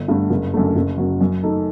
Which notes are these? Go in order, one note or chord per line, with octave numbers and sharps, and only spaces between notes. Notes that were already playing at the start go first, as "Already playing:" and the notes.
Already playing: G1
G2 D3 A3
F#1
F#2 D3 A3
F#1
F#2 F#3
F#2
D#3 A3 D#4 A4